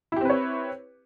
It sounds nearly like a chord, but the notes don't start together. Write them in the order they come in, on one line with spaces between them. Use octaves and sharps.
E4 G4 C4 B4 C#5